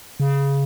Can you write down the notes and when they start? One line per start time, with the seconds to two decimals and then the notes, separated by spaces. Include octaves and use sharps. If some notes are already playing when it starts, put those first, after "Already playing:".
0.20 C#3